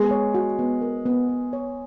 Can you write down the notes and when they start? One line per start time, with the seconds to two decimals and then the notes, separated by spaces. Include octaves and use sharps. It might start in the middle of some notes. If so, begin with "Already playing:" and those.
Already playing: G#3 B3
0.11 C#5
0.34 F#4
0.59 B3
0.82 A#4
1.06 B3
1.29 B3
1.53 C#5